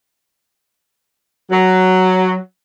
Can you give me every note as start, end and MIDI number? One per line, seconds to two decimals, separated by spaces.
1.51 2.36 54